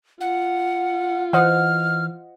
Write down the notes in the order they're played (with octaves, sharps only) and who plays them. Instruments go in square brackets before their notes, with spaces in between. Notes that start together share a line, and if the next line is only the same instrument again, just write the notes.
[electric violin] F4 [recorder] F#5
[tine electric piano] E3 [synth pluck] C5 D#5 F#5 [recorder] F6